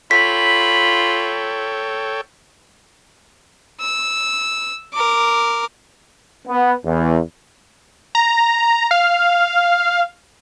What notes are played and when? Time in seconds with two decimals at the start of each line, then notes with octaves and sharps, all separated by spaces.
0.11 F4 A4 C#5 G5 B5 B6
3.81 E6
4.93 A#4 D6
6.47 B3
6.85 E2
8.15 A#5
8.91 F5